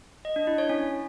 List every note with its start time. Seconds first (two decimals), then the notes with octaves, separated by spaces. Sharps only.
0.25 D#5
0.36 D4
0.47 E4
0.58 C#5
0.69 C#4